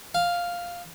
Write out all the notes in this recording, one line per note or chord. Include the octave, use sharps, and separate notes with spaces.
F5